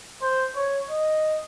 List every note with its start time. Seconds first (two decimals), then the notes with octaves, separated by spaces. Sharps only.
0.22 C5
0.56 C#5
0.90 D#5